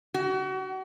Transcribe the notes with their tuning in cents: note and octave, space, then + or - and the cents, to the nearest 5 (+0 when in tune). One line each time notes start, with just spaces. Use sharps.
F#4 +35